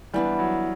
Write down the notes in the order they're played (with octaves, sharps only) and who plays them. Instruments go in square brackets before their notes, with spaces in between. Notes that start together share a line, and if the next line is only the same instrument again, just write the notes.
[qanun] E3 B3 D4 [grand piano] G3
[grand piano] F#3